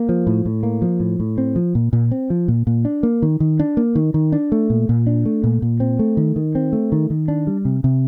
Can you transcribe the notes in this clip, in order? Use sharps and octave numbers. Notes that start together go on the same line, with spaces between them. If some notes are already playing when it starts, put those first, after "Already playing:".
Already playing: A#3
F3
A2
A2
A#3
F3
A2
A2
C4
F3
A#2
A#2
C4
F3
A#2
A#2
D4
A#3
D#3
D#3
D4
A#3
D#3
D#3
D4
A3
A#2
A#2
D4
A3
A#2
A#2
C4
A3
D#3
D#3
C4
A3
D#3
D#3
D4
G3
C3
C3